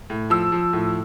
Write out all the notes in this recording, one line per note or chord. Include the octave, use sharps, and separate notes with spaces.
A2
F3 E6
F3
A2